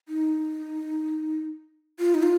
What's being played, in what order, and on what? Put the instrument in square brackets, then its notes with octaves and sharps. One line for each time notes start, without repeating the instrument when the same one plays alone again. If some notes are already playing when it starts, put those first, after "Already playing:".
[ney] D#4
F4
D#4
F4